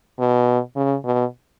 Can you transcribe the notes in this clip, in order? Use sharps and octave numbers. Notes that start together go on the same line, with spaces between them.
B2
C#3
B2